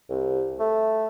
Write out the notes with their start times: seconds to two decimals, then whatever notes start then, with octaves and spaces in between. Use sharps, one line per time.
0.09 C2
0.60 A3